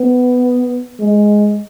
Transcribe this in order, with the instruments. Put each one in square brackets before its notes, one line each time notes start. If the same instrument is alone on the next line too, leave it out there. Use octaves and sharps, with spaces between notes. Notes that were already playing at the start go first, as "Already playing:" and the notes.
Already playing: [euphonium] B3
G#3